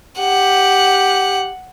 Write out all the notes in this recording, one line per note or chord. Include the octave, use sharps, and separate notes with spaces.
G4 F#5